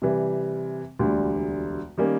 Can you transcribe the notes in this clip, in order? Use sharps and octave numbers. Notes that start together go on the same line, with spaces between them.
C3 E3 G3
E1 D2 D3 G3
D#3 G3 A#3 C#4